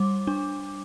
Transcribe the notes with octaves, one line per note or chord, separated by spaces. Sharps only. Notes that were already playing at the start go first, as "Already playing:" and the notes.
Already playing: G3 D6
D4